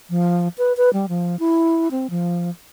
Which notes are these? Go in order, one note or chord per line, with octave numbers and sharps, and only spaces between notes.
F3
B4
B4
G3
F3
E4
C4
F3